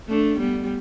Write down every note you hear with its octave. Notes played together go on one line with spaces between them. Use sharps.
A3 D4
G3 B3